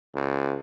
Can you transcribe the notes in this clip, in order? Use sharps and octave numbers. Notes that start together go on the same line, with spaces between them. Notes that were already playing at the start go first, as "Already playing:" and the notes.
C#2